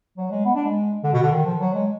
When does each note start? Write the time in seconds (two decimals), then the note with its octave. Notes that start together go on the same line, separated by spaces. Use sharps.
0.18 F#3
0.31 G#3
0.45 B3
0.55 D4
0.65 G#3
1.04 D3
1.13 B2
1.22 D3
1.32 D#3
1.46 F3
1.61 F#3
1.74 G#3